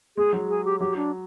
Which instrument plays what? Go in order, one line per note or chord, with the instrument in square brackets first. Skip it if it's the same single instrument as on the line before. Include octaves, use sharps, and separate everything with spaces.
[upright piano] G#3 [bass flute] G#4
[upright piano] F#3
[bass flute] G#4
G4
[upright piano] F#3 [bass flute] G4
[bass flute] D4